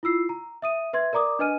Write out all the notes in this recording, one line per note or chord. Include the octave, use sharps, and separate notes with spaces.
E4 F4 E6 C7
A#5
E5 D#6 D#7
B4 E5 C6 G#6
A#4 D5 A#5 D6 D#6
D4 B4 D#5 G#5 F6 D#7